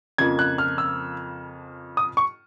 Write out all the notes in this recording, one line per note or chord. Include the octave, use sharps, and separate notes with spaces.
F2 C#3 F3 A#3 G#6
F#6
F6
E6
D#6
C#6